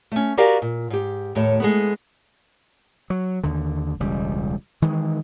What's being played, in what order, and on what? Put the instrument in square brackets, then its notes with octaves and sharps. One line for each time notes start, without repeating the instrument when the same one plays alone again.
[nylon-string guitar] A3 C#4
F#4 G4 A#4 D5 F5 G#5
A#2
G#2 G4
D#2 A2 A3 C#5
G#3 A3 B3
[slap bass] F#3
D#2 D3
E1 C#2 G3
D#3 E3 G#3